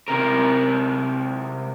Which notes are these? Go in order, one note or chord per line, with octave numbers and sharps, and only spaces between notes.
C3 A#4